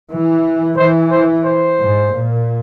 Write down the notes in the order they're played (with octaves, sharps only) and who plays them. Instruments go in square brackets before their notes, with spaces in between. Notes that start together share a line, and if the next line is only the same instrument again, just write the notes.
[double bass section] E3
[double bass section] E3 [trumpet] C5
[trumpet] C5
C5
[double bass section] G#2
A#2